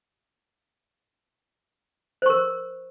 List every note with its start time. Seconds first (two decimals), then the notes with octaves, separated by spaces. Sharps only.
2.22 C5
2.26 C#6
2.30 A#4